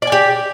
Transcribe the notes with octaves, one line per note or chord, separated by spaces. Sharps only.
G4 D5 G#5